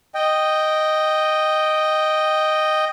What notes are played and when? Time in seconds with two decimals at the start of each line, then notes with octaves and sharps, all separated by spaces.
0.14 D#5 G5